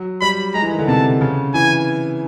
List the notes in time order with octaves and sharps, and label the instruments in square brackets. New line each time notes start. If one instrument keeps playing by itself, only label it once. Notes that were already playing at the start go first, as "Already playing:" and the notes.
Already playing: [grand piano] F#3
[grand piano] G3 [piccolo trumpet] B5
[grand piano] G#3 [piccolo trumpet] A#5
[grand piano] E3
D#3
D3
[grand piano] C3 [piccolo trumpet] A5
[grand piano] C#3
[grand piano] E3 [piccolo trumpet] G#5